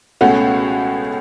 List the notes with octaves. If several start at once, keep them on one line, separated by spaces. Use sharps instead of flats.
C#2 B2 A3 C#4 F#4